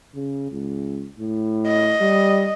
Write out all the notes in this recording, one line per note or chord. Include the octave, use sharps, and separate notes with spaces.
C#3
C#2
A2
D#5
G3